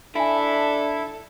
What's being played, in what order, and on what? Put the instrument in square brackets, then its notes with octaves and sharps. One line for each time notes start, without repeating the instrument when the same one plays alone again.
[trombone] D4 [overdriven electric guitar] E4 [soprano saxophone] A4 [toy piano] E5 G#5